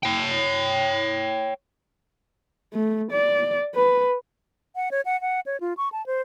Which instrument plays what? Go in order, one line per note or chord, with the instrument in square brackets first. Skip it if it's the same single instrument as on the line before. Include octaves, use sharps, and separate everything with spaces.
[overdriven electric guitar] C#5 G5
[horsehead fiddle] A3
D5
B4
[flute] F#5
C#5
F#5
F#5
C#5
F4
C#6
A5
C5